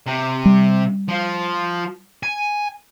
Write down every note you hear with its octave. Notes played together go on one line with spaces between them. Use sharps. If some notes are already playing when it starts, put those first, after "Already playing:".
C3
G3
F3
G#5